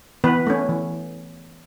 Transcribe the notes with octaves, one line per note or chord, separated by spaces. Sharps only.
E3 B3 B4
A3 C#4
E3